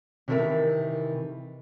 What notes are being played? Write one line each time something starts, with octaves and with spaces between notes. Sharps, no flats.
C3 D#3 E3 A4 A#4 E5